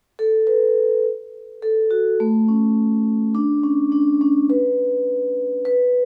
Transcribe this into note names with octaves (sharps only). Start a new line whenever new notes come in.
A4
B4
A4
F#4
A3
C#4
D4
C#4
D4
C#4
B4
B4